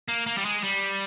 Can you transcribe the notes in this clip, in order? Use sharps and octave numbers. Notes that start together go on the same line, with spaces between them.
A#3
A#3
G3
G#3
G3